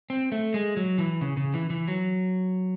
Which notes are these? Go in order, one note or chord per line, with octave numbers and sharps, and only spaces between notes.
C4
A3
G#3
F#3
E3
C#3
C#3
E3
E3
F#3